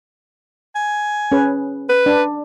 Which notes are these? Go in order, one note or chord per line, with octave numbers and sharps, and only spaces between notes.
G#5
C#4 G#4 B4
B4
D4